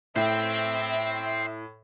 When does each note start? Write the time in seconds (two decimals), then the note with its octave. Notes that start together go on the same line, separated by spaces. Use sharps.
0.16 A2 C5 E5 G5